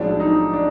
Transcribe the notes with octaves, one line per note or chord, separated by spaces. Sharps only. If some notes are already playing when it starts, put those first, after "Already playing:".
Already playing: B1 A2 F3 G#3 D4
D#4
D4